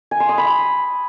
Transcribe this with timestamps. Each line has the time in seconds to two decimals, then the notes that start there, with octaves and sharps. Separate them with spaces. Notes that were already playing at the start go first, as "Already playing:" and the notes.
0.11 G#5
0.20 C6
0.29 D#6
0.38 B5